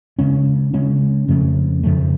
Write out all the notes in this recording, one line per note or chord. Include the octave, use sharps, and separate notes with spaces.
C#3 G#3 C#4
C#3 G#3 C#4
F2 C#3 F3 A3
F2 C#3 F3 A3